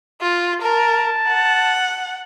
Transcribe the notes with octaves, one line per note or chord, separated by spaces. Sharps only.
F4
A#4 A5
F#5